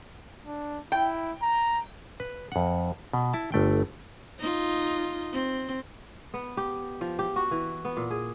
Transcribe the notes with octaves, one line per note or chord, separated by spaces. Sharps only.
D4
E4 G5
A#5
B4
F2 F#5
B2
E4 A5
G1 A3 G5
D#4 F4
C4
B3
G4
F3
G4
F#4
E3
B3
A#2
G#4